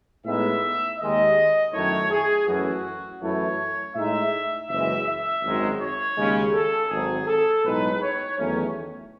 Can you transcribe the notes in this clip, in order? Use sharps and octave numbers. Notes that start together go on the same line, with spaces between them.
A2 G#3 B3 D#4 E5
D#2 D#3 G#3 D#5
F#2 D#3 A3 E4 C#5
G#4
F#2 E3 A3 C#4 E4 F#4
F#2 E3 A3 E4 C#5
A2 G#3 D#4 E5
F#1 F#2 E3 G#3 E5
E5
G#1 F#2 D#3 G#3
C#5
D#2 C#3 G#3 C#4
A4
G#1 G#2 F#3 G#4
A4
B1 A2 G#3 D#4 B4
C#5
E2 D#3 F#3 A3 C#4